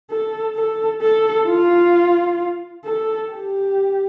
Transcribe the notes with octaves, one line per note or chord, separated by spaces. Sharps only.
A4
A4
A4
F4
A4
G4